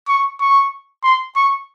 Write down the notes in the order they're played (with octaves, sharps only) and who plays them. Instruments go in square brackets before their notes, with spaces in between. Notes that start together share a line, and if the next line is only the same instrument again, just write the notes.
[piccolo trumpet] C#6
C#6
C6
C#6